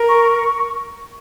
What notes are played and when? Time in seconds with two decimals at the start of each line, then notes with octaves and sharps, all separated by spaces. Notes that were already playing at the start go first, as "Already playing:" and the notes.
Already playing: A#4
0.09 C#6